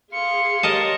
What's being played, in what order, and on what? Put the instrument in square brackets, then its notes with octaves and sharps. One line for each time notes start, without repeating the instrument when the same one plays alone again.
[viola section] G#4 [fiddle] F5 C6 [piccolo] C#7
[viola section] G4 C#5 [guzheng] A#4 D#5 A5